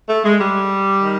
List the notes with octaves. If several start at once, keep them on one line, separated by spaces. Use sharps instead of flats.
A3
G#3
G3
D#3